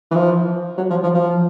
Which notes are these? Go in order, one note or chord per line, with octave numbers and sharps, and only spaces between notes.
E3
F3
F#3
F3
F3
F3